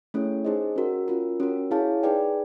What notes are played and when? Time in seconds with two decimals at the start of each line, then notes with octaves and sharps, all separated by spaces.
0.14 A3 C#4 E4 G#4 C#5
0.44 D#4 G#4 C5 D#5
0.76 C#4 F#4 A#4
1.08 C#4 F4 A#4
1.40 C#4 F#4 A#4
1.71 E4 G#4 C#5 F5 A5
2.03 D#4 G#4 B4 D5 G5